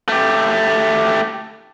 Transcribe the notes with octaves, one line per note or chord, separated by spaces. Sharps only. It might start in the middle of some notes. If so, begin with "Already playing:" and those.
A3 G4